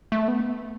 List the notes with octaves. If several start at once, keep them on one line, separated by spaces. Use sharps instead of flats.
A3
B3